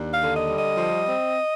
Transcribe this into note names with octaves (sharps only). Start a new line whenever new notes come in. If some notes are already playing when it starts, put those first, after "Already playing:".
Already playing: D#2 D4
F5
D3
D#5
G3
D#5
F3
C4